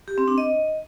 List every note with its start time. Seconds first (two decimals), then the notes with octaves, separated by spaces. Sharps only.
0.08 G4
0.18 C4
0.28 D4
0.38 D#5